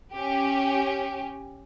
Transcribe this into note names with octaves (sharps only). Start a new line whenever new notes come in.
C#4 G4